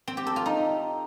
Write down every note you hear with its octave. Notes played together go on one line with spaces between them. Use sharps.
C4
G4
A4
F4
D#4